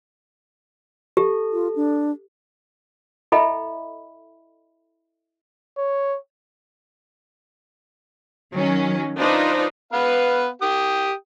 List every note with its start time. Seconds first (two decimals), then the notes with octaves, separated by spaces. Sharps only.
1.17 G4 A4
1.53 F4
1.76 D4
3.32 E4 A4 D#5 E5 G5 B5
5.78 C#5
8.53 D#3 F#3 C#4
9.17 D4 D#4 F4 B4 C5
9.93 B3 B4 F5
10.62 G4 G5 D#6